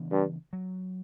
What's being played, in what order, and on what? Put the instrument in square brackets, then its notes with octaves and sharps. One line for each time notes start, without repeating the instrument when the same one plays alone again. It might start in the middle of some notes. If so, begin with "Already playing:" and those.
Already playing: [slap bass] C#3 E3 B3 D4
[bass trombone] G2
[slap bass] F#3